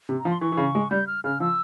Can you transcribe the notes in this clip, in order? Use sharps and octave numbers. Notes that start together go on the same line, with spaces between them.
C3
A#5
F3
C6
E3 C#6
E3
C#3
G#3
G3 G6
F6
C#3 F6
F3 E6